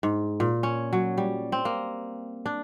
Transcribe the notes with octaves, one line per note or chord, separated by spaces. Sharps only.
G#2
A#2
C#4
F#3
G3
C4
A#3
D4